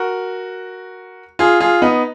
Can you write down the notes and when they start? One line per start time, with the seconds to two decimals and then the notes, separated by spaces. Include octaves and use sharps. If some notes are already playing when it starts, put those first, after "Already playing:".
Already playing: F#4 A#4
1.39 F4 G#4
1.60 F4 G#4
1.82 B3 D#4